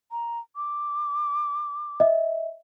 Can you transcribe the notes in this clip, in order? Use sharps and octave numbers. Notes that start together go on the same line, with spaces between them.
A#5
D6
D#5 E5